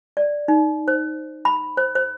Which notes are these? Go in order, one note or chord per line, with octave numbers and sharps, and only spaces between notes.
D5
D#4
C5
B5
C5
C5